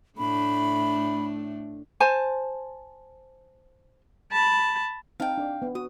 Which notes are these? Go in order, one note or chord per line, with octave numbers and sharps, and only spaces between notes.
A2 A3 D4 B5
C5 G#5 A5
A5 B5
C4 D#4 F5 G5 A5
D4 D5
B3
F#4 D#6